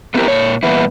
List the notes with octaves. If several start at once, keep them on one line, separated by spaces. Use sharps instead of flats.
A3 B3 C4 E4 G4 A#4
A#2 C#5
G2 A#2 E3 B3 E4